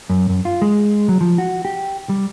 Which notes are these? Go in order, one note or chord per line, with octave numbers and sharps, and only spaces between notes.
F#2
F#2
F4
G#3
F#3
F3
F#4
G4
G3